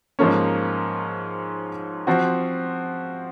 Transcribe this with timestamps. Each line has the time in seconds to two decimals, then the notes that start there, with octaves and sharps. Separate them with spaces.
0.19 G#2 F3 A#3 C#4
2.07 F3 C4 F#4